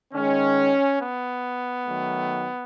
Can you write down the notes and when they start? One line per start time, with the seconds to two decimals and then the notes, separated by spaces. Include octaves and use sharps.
0.13 D#3 G#3 C#4
1.00 B3
1.87 D#3 F#3 A3